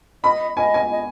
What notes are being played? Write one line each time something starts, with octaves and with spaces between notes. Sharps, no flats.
D#5 B5
D#5 G#5
G#5
D#5